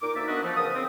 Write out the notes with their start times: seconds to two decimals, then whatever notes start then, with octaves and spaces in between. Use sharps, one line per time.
0.01 A#2 D#4 A#4 D6
0.15 D2 A#3 D#4 D5 E5
0.28 A#3 B3 D4 F#4 B4 D#5
0.43 F3 A3
0.56 C#3 A#4 B4 F5 D#6
0.74 C4